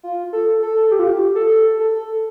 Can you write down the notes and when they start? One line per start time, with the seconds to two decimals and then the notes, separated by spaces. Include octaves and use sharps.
0.03 F4
0.33 A4
0.62 A4
0.91 G4
0.99 F4
1.08 G4
1.35 A4
1.79 A4